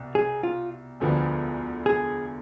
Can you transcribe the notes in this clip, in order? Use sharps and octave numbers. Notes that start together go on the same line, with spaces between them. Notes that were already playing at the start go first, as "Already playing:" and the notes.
Already playing: C2 B2
G#4
F4
E1 D2 D3 F3 B3
G#4